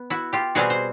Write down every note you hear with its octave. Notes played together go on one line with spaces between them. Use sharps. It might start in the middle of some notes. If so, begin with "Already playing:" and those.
Already playing: B3
E4 F#4
F4 G4
B2 G3 C4 F#4 G#4
C5